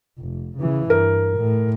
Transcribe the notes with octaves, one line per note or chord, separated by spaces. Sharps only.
F1
C#3 E3
G2 A#4
A2